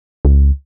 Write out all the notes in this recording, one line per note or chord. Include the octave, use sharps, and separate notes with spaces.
C#2